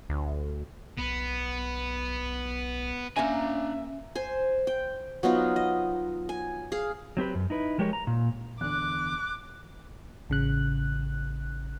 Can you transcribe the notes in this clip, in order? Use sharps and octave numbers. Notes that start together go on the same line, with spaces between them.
D2
B1 B3
A#3 C#4 D4 E5 G#5 A#5
C5 G#5
G5
F#3 B3 D#4 F4
D#5
G#5
G#4 F5
F#3 C4 G4 B4
F#2
D#4 E4 B4
F3 G#3 G4 A#4 C#5
A#5
A#2
E2 D3 D6 F#6
A1 C#3 F#6